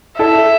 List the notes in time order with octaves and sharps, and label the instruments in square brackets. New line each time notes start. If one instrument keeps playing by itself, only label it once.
[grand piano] E4 A4 [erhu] E5